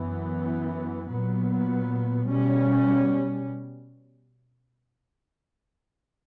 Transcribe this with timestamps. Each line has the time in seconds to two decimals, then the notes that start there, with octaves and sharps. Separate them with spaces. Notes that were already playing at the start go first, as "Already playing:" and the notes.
Already playing: F#2 E3 B3
1.08 A#2 F#3 B3
2.27 B2 G3 C#4